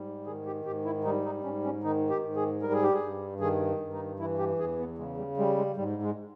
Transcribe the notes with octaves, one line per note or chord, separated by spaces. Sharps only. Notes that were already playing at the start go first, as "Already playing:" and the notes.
Already playing: G#2 G3
D#3 G#4
G4
G#2 G4
E4
G3 D#4
D#4
G#2 C#4
C#4
D#3 D#4
G4
G#2
G#4
G3 A#4
G#4
G4
G#4
G2
D#3 G#4
G2
D#4
E3 E4
G4
E2 G#4
B3
C#3 G#3
G3
G3 G#3
G#3
G#2 G3
G#3